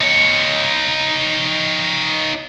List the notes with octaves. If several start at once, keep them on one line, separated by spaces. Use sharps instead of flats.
D#4 C#5